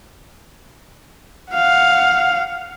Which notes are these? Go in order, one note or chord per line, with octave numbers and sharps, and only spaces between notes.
F5 F#5